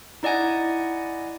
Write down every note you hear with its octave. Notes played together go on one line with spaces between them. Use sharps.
D#4 E4 D5 D#5 F#5 G#5